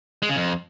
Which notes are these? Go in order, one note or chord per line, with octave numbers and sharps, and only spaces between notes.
G#3
C#3
F2